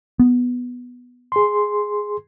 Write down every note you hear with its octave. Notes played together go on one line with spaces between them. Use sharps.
B3
G#4 C6